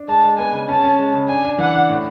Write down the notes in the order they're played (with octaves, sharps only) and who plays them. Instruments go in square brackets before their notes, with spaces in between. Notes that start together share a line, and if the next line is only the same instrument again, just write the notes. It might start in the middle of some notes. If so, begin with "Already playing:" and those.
Already playing: [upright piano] D4
[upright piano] G#3 [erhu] A5
[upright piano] G#3
[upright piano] B3 [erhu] G#5
[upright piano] C#3
[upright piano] C#4 [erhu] A5
[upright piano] C#4
G#3
C#3
[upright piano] D4 [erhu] G#5
[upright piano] D4
[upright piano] E3 [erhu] F#5
[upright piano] D4
A2